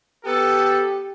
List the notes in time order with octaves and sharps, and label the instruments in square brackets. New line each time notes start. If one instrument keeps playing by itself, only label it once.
[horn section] B3 A4 [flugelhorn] G4